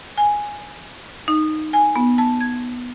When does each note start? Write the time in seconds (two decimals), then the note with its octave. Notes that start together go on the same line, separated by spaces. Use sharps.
0.18 G#5
1.28 D#4
1.73 G#5
1.96 B3
2.18 A5
2.40 G#6